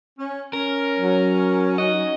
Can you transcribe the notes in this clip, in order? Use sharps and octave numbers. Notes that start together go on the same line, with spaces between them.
C#4
C#4 A#4
F#3
C#4 D#4 F#4 D#5